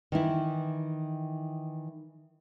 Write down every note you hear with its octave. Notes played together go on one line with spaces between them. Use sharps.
D#3 E3 E4